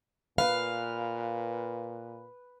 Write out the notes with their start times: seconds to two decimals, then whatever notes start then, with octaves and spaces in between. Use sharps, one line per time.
0.38 A#2 B4 F5